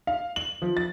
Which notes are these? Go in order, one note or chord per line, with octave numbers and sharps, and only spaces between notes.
F5
F#7
F3
A6